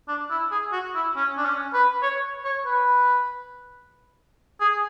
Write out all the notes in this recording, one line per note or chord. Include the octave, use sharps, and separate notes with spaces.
D4
E4
G#4
F#4
E4
C#4
D4
C#4
B4
C#5
C#5
B4
G#4